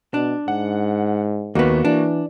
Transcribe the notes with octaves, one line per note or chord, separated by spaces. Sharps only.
B2 D4
G#2 F#5
D#2 A#3 B3 F#4
E3 D4